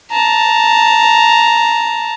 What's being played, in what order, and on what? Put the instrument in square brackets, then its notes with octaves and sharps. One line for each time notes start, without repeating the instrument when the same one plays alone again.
[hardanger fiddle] A5 A#5